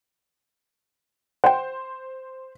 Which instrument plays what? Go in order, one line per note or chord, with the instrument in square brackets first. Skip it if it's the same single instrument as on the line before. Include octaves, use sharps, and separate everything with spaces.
[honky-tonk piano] C5 [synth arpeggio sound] F#5 G5